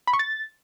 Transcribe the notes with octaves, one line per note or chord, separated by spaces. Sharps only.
B5
C#6
A6